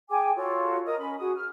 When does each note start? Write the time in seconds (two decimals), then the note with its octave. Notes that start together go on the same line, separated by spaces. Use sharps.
0.10 G#4 G5 G#5 D6
0.36 F4 F#4 A4 C#5
0.86 A#4 D#5 D#6
0.98 C#4 B5
1.19 F#4 G#4 D#6
1.35 F6